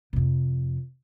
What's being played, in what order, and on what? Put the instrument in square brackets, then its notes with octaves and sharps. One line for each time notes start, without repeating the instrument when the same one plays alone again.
[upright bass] F2 C3